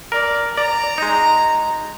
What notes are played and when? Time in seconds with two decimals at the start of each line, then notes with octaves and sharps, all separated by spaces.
0.12 A#4 D5
0.57 D5 A#5
0.98 G#3 D#4